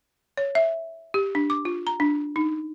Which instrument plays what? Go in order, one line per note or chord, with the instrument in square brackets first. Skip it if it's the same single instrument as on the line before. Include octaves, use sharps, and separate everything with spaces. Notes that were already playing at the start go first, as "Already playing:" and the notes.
[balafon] C#5
E5
G4
D4
D6
F4
A#5
D4
D#4